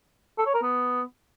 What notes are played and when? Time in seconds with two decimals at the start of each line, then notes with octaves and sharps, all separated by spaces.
0.38 A4
0.46 C#5
0.54 A#4
0.62 B3